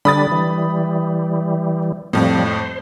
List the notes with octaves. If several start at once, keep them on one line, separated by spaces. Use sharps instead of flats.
D3 G3 D4 B5 D#6 A6
E3 G3
F2 A2 F3 G3
C5